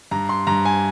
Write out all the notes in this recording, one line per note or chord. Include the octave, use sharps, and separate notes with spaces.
G2 A#5
C6
G2 A#5
G#5